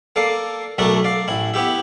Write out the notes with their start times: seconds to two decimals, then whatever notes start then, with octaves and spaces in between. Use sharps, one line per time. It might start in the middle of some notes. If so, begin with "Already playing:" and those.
0.16 A#3 A4 D5 F5
0.78 B1 A3 D4 A4 A#4
1.04 D5 F5
1.28 A1 E4
1.54 B3 E4 G4 E5